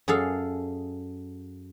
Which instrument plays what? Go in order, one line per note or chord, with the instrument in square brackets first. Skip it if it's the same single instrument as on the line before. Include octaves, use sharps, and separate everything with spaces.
[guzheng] F#2 G#4 A4 F5